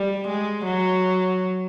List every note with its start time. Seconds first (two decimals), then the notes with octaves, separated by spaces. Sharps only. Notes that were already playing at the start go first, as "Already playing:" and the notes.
Already playing: G3
0.27 G#3
0.65 F#3